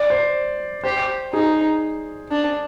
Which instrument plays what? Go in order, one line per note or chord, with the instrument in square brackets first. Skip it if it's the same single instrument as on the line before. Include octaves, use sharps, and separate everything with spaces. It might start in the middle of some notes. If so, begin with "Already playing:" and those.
Already playing: [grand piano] D5
C5
[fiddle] G4 [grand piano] C5
[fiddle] D#4 [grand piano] G#4
[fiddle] D4